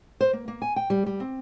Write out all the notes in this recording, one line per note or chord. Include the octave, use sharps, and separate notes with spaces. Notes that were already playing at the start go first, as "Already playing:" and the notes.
C5
A#3
A#3
G#5
G5
G3
G3
C4